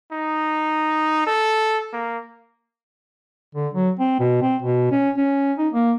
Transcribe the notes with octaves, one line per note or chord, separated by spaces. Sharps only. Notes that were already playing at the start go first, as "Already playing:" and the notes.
D#4
A4
A#3
D3
F#3
C4
B2
C4
B2
C#4
C#4
D#4
A#3